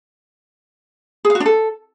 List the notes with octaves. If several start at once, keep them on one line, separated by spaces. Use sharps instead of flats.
G#4
F5
F#4
D4
A4